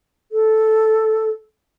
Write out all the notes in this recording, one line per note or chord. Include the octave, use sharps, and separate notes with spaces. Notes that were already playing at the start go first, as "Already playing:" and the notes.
A4